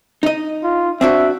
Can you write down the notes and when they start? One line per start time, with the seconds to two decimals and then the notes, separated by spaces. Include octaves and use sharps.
0.23 D#4 D#5
0.64 F4
1.01 C4 D4 F#4 E5